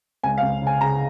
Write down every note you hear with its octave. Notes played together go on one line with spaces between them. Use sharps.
C#2 G#5
F5
C#2
C#3 G#5
C#3 A#5